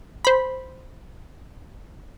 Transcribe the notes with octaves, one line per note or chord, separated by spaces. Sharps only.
C5 B5